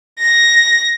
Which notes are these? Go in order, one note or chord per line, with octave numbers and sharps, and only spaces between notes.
A#6